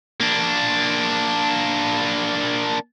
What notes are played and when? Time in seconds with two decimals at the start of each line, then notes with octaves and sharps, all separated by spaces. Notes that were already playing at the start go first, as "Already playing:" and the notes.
0.20 A#3 D4